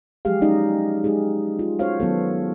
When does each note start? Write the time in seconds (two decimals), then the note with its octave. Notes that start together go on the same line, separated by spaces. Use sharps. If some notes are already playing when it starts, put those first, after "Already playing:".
0.25 F3 F#3 G#3 G4 G#4 F5
0.41 G#3 C#4 D#4 D5 D#5
1.04 G#3 D#4 G4 G#4
1.59 F4
1.79 C#4 F#4 C5 C#5 F5
2.00 D#3 F#3 B3 A4